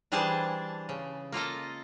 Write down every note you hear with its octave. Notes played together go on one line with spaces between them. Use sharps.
E3 G3 D4 G#4 C5 A5
C#3
A#3 F4 A4 D#5